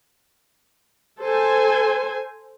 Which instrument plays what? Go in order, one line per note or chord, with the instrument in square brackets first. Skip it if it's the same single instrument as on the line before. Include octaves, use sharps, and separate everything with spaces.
[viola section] A4 C5 G#5